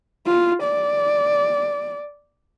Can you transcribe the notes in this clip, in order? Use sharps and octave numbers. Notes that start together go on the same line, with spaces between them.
F4
D5